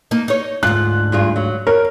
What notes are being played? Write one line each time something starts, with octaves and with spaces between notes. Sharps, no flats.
A#3 D#4
D#4 C#5
D2 G#2 F4 F#6
G2 F4 G#4
F#3
A#4 C#5